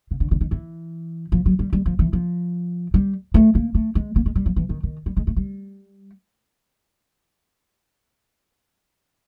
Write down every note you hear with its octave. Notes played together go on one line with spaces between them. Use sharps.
C#3
D3
D3
D#3
E3
F3
F#3
G3
G3
F3
E3
F3
G3
A3
A#3
A3
G#3
A#3
G#3
G3
F3
E3
D#3
D#3
G3
G#3
A3
G3